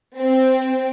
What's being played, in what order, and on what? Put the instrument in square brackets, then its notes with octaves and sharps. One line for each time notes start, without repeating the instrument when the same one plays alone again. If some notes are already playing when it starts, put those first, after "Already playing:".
[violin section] C4